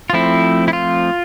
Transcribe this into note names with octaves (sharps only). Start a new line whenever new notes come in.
F4
F3 A3 C4 E4
E4
F4